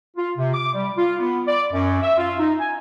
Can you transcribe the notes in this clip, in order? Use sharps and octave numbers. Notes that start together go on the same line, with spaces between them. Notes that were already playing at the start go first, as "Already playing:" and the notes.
F4
C3
D6
G3
F4
B3
D5
F#2
E5
F4
D#4
G#5